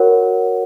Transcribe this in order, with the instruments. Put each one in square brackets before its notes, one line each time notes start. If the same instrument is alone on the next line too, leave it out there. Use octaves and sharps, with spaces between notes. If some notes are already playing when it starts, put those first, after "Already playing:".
Already playing: [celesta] F#4 A#4 C#5 F#5